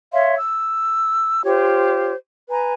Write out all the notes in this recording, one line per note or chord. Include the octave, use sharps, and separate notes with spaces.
C#5 E5 F5 C6
E6
F4 G4 C5 C#5
B4 G#5 A#5